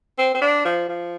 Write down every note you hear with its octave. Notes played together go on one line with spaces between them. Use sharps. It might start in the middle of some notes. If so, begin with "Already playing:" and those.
C4
C4
D4
F3
F3